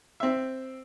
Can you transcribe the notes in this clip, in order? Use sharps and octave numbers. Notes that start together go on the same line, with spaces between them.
C4 E5